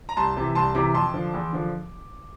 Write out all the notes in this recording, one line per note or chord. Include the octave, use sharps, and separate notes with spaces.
A#5
C2 A5 C6
C3 E3
C2 A5 C6
C3 E3 A#5 D6
F2 A5 C6
D3 F3
E2
D3 F3